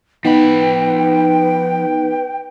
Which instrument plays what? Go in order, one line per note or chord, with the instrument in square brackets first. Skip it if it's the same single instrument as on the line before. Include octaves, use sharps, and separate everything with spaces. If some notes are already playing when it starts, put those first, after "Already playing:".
[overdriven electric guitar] F3 B5 [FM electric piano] B3 D#4 F#5 [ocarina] B4 [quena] G5